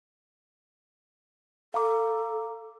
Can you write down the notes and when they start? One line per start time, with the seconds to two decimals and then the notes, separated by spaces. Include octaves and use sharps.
1.74 A4 F5 A#5 D6